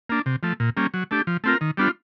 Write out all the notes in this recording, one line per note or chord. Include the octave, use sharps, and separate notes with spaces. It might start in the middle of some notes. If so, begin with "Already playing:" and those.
A#3 D4
C3
F3 A3
A#2
G3 A#3 C#4
F#3
A3 D4 G4
F3
A3 C4 F4 A#4
D#3
G3 B3 D4 F4